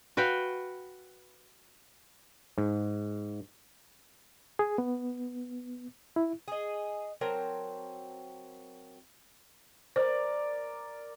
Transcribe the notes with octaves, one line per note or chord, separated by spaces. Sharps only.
F#4 B4 F5 G5
G#2
G#4
B3
E4
G#4 D#5
F#3 C4 A#4 A5
A#4 C5 D5